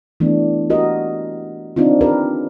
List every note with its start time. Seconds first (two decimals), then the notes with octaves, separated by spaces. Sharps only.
0.20 E3 A3 B3 D4
0.70 F#4 G4 A#4 D#5
1.76 C4 D4 D#4 F4
2.01 G4 A#4 B4